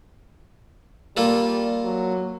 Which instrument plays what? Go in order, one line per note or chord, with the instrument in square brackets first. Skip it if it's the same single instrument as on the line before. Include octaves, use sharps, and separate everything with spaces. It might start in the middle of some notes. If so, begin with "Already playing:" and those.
[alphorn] G3 [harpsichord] A#3 F4 A4
[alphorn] F#3